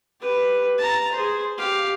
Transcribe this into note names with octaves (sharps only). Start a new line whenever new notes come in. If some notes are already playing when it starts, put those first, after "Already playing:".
G4 B4
A5 A#5
G#4 C5
G4 F5